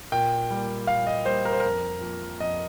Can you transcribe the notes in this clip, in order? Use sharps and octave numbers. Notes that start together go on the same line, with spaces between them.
A#2 G5
G3 A#3
A#2 F5
D#5
G3 A#3 C5
A#4
C5
F2 A#4
F3 A#3
F2 D#5